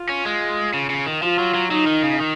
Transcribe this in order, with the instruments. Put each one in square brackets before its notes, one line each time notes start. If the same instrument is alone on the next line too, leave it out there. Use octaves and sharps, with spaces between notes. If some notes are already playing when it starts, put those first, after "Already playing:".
Already playing: [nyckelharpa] F4
[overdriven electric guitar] C#4
G#3
C#3
C#3
D#3
[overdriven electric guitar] F3 [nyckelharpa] F4
[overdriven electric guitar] F#3
F#3
[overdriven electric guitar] F#3 [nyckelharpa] D#4
[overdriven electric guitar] D#3
C#3
D#3